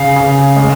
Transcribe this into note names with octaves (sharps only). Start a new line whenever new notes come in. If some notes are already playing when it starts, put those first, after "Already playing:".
Already playing: C#3 F5
C#3
G#3